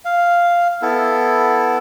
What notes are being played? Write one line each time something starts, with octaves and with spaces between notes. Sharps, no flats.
F5
B3 E4 A4